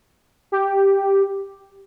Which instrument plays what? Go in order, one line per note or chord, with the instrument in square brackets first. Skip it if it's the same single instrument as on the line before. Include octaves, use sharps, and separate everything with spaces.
[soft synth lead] G4